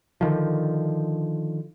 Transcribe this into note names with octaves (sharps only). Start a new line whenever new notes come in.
D3 D#3 F3